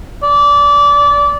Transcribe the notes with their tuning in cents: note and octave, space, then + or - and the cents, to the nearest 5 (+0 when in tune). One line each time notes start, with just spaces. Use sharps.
D5 -25